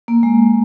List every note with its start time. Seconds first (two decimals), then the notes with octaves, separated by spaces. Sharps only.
0.08 A#3
0.23 G#3